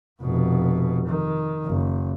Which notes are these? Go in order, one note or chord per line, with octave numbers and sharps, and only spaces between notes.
F1 B2
D#3
F#1